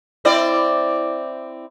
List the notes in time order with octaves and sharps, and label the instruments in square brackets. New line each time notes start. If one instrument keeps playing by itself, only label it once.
[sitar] C4 E4 D5